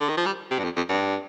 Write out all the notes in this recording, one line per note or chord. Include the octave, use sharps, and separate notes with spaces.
D3
D#3
F3
G3
C3
G2
F2
F2
G2